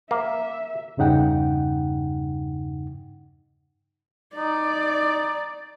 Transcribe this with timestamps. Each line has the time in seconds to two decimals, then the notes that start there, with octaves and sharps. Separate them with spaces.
0.11 A#3 E5
0.97 E2 G2 C#3 D#4 F#5 G5
4.36 D#4 D5